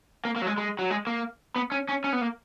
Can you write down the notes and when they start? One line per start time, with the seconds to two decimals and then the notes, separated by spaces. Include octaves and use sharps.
0.25 A#3
0.36 A#3
0.42 F#3
0.47 G#3
0.58 G#3
0.79 F#3
0.90 G#3
1.07 A#3
1.56 B3
1.72 C#4
1.89 C#4
2.04 C#4
2.13 B3
2.21 A#3